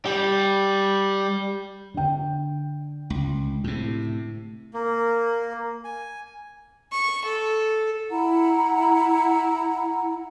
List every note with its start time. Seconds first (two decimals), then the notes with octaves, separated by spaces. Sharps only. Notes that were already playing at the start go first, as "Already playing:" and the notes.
0.06 G3 G4
1.94 D3 G5
3.10 C#2
3.64 A2 C3
4.74 A#3
5.84 G#5
6.92 C#6
7.25 A4
8.10 E4 F#5 A#5